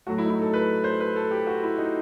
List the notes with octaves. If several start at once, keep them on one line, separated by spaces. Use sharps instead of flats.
A2 F#3 A3 F#4
E4
D#4
E4
A4
B4
C5
B4
A4
G4
F#4
E4
D#4